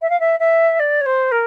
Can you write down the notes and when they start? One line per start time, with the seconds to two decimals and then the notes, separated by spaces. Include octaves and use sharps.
0.02 E5
0.10 F5
0.20 E5
0.39 E5
0.79 D5
1.01 C#5
1.06 C5
1.31 A#4